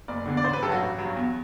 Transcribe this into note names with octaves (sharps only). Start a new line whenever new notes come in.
F#1 D5
E2 D3
D5
A1 C5
B4
G2 F#3 F#4 A4
A1
G2 F#3
E2